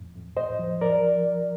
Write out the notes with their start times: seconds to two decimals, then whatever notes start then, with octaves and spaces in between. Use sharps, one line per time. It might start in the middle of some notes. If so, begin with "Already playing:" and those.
Already playing: F2 A2
0.15 F2
0.37 A2 C5 D#5
0.59 F3
0.81 F3 A#4 D5